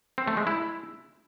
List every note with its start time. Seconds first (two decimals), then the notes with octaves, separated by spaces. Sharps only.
0.18 C4
0.28 A3
0.37 G#3
0.47 E4